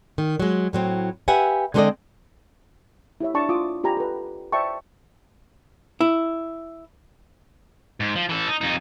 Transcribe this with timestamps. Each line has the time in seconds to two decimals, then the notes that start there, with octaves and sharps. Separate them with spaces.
0.18 D#3
0.40 F#3 G#3
0.73 A2 F#3 C4
1.28 G4 B4 E5 F#5 G#5
1.74 D3 G#3 C4 A4 D5 D#5
3.21 E4 G4 C#5 E5
3.34 D4 D5 A5 C#6
3.49 F4 D6 D#6
3.84 F4 G4 G#5 A#5 B5
3.97 A4 B4
4.52 C5 D5 E5 G5 A5 C#6
6.01 E4
8.00 G#2
8.15 F3
8.29 E3 A4
8.48 D#4
8.61 F2 D#4